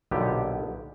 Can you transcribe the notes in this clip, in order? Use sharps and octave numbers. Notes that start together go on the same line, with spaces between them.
B1 A#2 D3 B3 G4